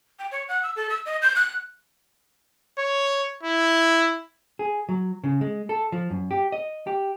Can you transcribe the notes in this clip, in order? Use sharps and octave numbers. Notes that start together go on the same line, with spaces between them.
G5
C#5
F#5
E6
A4
E6
D#5
G6
F#6
C#5
E4
G#4
F#3
C#3
G#3
A4
F3
F#2
G4
D#5
G4